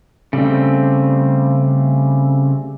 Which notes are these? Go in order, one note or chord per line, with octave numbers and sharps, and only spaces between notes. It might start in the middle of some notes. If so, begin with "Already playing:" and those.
C#3 G3 A3 C4